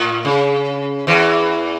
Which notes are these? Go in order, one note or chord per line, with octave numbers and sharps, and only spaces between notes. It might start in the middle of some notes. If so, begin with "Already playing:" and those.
Already playing: A2
C#3
E2 E3